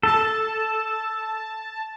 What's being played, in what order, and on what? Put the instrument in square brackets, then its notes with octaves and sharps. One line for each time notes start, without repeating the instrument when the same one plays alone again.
[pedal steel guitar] A4 [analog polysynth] A5